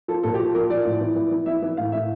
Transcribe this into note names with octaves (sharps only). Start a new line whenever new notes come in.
F3 A4
A#2 A4
G4
F3
A4
F3 A#4
F3 D5
A2
E3
E3
E3
E3 E5
E3 E5
A2 F5
A2 E5